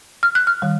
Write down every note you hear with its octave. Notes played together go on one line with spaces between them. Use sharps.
F6
F#6
F6
D#3 G3